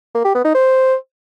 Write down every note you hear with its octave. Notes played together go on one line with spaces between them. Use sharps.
A#3
G4
B3
D#4
C5